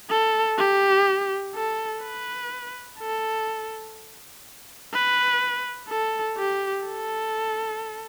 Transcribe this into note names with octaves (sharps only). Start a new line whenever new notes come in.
A4
G4
A4
B4
A4
B4
A4
G4
A4